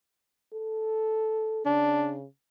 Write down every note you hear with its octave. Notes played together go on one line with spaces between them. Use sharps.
A4
C#3 D4